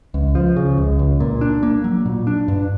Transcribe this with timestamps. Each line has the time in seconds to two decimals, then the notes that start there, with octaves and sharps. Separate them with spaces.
0.14 C#2
0.35 F3
0.56 C#3
0.78 C#2
0.99 C#2
1.20 A#2
1.41 D4
1.63 A#3
1.84 F#3
2.06 A#2
2.27 D4
2.48 G2